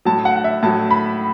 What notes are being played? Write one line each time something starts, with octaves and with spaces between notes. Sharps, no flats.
A2 F#3 A5
F#5
F#5
E5
A2 F#3 A5
B5